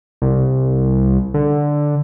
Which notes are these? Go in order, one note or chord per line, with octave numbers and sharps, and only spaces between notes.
C2
D3